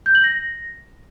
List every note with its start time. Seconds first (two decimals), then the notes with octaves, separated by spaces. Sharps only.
0.06 G6
0.15 F#7
0.24 A#6